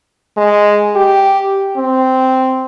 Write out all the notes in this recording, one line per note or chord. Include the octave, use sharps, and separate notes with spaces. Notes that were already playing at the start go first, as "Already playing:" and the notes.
G#3
G4
C4